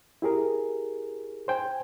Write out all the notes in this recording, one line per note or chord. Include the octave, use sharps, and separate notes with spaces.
E4 G4 G#4 A#4
C5 G5 G#5